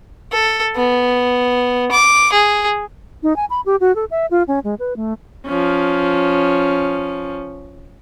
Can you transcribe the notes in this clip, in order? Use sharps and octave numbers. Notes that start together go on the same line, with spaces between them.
A4
B3
D6
G#4
D#4
G#5
B5
G4
F#4
A4
E5
F4
C#4
G#3
B4
A3
F3 C#4